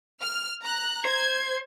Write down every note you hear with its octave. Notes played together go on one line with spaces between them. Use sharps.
F6
A#5 F#6
C5 G#6